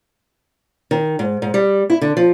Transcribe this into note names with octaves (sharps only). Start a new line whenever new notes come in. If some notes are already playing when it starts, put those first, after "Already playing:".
D#3
G#2
G#2
G3
E4
D3
F3